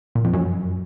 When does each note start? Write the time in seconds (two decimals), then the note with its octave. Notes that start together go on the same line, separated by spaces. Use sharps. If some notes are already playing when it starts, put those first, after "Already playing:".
0.15 A#2
0.24 F2
0.33 F#2